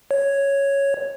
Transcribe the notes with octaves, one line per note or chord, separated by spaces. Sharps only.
C#5